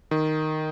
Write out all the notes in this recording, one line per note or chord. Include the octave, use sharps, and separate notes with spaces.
D#3